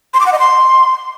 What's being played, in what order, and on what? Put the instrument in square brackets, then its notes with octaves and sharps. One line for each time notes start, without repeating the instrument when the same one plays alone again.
[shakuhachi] C6
D6
F#5
D#5
C6